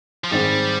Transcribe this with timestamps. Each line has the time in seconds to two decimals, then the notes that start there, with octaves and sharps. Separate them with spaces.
0.24 F3
0.31 G#2 D#3 G3 G#3 C4